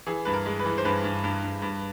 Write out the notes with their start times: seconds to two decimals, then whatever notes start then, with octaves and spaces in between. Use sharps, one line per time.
0.07 E3 G#4
0.25 G2 B4
0.33 A#4
0.46 G#3
0.59 B4
0.66 E3
0.78 C5
0.85 G2 B4
1.04 G2
1.24 G2
1.43 G2
1.62 G2